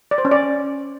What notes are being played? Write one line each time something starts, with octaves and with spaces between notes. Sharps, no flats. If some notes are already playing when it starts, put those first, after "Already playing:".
D5
C5
C#4
D5